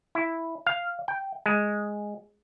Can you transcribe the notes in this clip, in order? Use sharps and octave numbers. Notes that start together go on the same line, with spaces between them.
E4
F5
G5
G#3